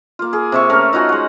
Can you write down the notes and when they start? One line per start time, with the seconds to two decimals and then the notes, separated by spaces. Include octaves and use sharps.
0.19 A#3 F4
0.33 G#4
0.52 C3 E5 C#6
0.70 A3 C#4 A#4
0.93 D#4 F4 F#4 G#5
1.09 G#3 F#5